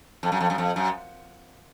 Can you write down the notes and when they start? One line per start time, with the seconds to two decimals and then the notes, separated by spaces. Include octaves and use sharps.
0.23 F2
0.32 F#2
0.40 F2
0.50 F#2
0.58 F2
0.76 F#2